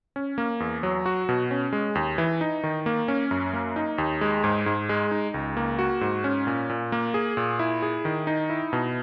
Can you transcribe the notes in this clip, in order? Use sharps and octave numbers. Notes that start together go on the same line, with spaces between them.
C#4
A#3
E2
F#3
F#4
B2
C#4
G#3
D#2
E3
D#4
D#3
A#3
C#4
F#2
A#3
D#4
D#2
G#3
G#2
G#2
G#3
D#4
C#2
A#3
F#4
G#2
C#4
A#2
A#2
A#3
G#4
A#2
E4
G#4
D#3
D#4
E4
B2